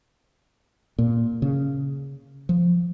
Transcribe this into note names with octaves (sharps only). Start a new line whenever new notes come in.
A#2
C#3
F3